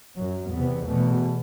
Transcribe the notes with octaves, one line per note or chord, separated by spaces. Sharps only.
F#2 F#3
E2 C3 B3
E2 B2 A3